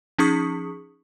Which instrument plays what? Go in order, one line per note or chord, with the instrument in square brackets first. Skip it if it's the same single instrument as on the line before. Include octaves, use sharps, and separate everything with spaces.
[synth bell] F3 C#4 D#4 G#4 C#6 D#6